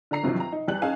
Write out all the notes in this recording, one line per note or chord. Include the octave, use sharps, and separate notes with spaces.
D3 D4 A#5 C7
G2 C3 D#3 F3 F#3
A#5
D#4
E2 G3 F#6 F#7
C#4 D#4 G#4 F5 G#5 A5